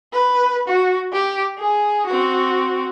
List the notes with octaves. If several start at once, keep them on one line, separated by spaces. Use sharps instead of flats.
B4
F#4
G4
G#4
C4 F#4